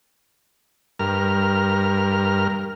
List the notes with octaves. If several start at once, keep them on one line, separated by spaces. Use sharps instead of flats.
G2 A#4 F6